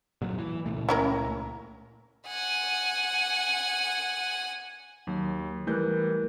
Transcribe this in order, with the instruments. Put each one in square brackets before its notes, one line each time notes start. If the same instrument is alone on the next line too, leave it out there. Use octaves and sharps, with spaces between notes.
[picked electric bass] A#2 F#3
E3
C#2 A#2 A3
[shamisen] C#4 E4 A#4
[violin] F#5 G#5
[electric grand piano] D#2 [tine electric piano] F#3
[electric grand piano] E3 G3 G6 [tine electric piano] A3 A#4 F#6